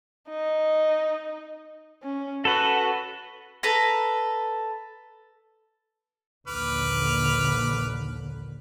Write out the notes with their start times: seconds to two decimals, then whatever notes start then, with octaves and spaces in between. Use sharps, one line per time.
0.30 D#4
2.03 C#4
2.45 F#4 A4 B4
3.63 A4 B4 A#5
6.48 A#1 D#2 D3 B4 D6 F6